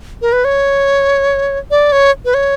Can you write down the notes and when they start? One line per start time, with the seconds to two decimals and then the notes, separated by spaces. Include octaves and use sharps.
0.22 A#4
0.32 B4
0.44 C#5
1.71 D5
1.92 C#5
2.25 B4
2.34 C#5